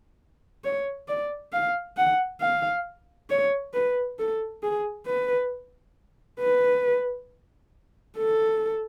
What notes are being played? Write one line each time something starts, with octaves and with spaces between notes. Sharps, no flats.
C#5
D5
F5
F#5
F5
C#5
B4
A4
G#4
B4
B4
A4